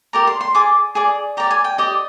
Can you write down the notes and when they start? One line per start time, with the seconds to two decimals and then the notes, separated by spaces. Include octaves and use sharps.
0.13 G4 A#4 D5 A#5
0.27 C6
0.41 C6
0.55 G#4 D5 D6
0.95 G#4 D5
1.37 G4 D5 A#5
1.51 G#5
1.64 G5
1.78 G4 D5 D#5